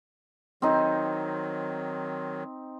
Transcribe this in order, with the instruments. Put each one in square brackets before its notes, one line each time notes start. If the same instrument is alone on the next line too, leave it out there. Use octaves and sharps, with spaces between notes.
[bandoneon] D#3 F#3 [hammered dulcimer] C4 D#4